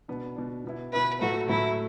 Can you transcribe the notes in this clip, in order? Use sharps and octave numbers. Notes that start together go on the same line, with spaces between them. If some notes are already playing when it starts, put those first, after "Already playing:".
B2 B3 D4
B2 B3 D4
B2 B3 E4
B2 B3 E4 B4
A2 F#3 A3 F#4
A2 F#3 A3 E4